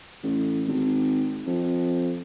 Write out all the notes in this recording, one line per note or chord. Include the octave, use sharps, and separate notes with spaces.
A1
G#1
F2